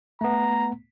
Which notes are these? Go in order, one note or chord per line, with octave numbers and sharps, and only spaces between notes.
A3 B3 A#5